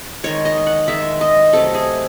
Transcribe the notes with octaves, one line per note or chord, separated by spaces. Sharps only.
D#3 G#3 C#5
D#5
F#5
D#3 G#3 E5
D#5
C3 F#3 A3 A4
G#4